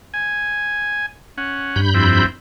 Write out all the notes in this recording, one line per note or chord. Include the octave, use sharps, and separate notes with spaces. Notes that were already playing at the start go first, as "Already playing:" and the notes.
G#5
C#4 F#5
G2 B5 G6
F2 C4 E4